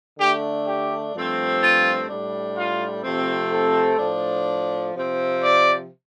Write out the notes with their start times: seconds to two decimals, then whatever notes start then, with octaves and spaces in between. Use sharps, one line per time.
0.19 D3 A3 D4 G4
0.67 G4
1.14 G2 F3 A3 C4
1.62 F4
2.09 A2 G3 D4
2.56 F4
3.04 C3 F3 A3 C4
3.51 A4
3.99 A2 F3 D4
4.94 C3 F3 C4
5.42 D5